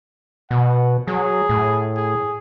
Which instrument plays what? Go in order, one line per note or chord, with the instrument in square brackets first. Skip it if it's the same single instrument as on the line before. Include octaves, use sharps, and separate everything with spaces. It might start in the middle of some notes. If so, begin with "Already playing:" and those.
[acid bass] B2 [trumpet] F#5
[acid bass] F#3 [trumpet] G#4
[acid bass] A2
[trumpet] G#4